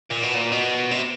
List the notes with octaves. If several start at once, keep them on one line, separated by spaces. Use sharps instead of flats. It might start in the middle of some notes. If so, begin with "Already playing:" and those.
A#2
B2
A#2
B2
C3